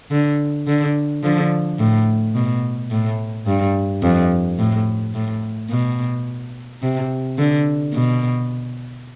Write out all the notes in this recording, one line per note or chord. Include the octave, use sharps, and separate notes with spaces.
D3
D3
D3 F3
A2
B2
A2
G2
F2
A2
A2
B2
C3
D3
B2